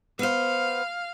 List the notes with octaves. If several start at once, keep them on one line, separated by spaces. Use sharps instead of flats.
B3 C5 F5